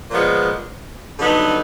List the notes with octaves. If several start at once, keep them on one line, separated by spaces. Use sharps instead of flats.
A#2 F3 G#3 B3
G2 D3 F#3 B3 D#4